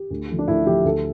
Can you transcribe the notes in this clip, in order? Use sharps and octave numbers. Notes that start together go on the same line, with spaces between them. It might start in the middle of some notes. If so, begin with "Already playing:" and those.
Already playing: G4
D2
D3 F3 A3
D4
D2 E4
D3 F3 A3 G4
D2 A4